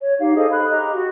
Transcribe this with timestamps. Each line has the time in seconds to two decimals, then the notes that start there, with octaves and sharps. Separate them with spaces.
0.01 C#5
0.19 D#4 G4 F5
0.35 G#4 A4 C5 D#5
0.51 B5 F#6
0.70 G4 D#5 A#5
0.93 F#4